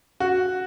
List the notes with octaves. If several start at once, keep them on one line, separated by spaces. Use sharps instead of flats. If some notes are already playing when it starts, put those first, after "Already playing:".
F#4